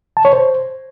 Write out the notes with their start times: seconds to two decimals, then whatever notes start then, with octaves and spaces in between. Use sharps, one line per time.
0.17 A5
0.25 C#5
0.33 C5